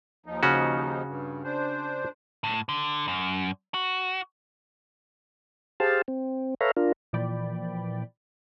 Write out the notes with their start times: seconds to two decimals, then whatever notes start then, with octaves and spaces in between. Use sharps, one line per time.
0.26 D#2 F3 D#4
0.43 C#3 C#4 F#4
1.07 G2
1.44 D4 C5
2.44 A2
2.69 D3
3.08 F#2
3.74 F#4
5.80 G4 G#4 C5 F5 A5
6.08 C4
6.61 A4 B4 C#5 E5 F5 A#5
6.77 D4 F4 A#4
7.13 A#2 E3 F3 D5 G5 B5